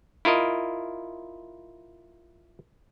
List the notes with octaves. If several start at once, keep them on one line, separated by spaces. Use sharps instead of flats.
E4 F4 A#4 D#5